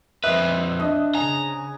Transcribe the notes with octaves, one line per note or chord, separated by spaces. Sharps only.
F2 B4 C5 D#5 E5 F#6
D4 D#5
C#3 G#5 A#5